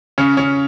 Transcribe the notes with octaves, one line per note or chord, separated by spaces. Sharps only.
C#3 C#4
C#3 C#4